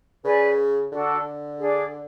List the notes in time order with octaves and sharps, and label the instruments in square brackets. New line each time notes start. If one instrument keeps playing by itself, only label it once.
[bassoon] C#3 [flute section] B4 D5 G#5
[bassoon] D3 [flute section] D4 F#4 A4
[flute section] D4 G#4 D5